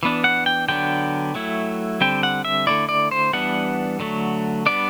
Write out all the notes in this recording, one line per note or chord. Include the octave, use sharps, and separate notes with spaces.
E3 B3 D4
F#5
G5
D3 F#3 B3 D4 G5
F#3 A3 E4
D3 G3 C4 G5
F#5
E5
D3 A3 C4 E4 D5
D5
C5
E3 G3 B3 D4 F#5
D3 F#3 A3
G3 B3 D4 D5